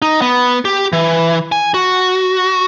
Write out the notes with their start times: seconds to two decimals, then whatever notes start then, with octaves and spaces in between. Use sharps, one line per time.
0.02 D#4
0.22 B3
0.65 G4
0.93 E3
1.52 G#5
1.74 F#4